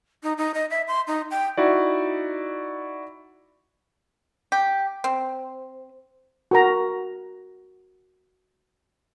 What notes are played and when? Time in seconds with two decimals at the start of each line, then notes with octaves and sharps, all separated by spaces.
0.23 D#4
0.38 D#4
0.54 D#5
0.70 E5
0.88 C6
1.07 D#4
1.31 G5
1.57 D#4 E4 F#4 D5
4.52 G4
5.04 C4
6.51 F#4 A#4 A#5